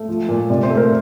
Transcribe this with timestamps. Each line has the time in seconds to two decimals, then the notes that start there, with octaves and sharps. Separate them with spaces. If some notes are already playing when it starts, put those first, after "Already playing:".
Already playing: A3
0.08 F3
0.29 A#2
0.50 C3 D5
0.63 C5
0.70 A3
0.77 A#4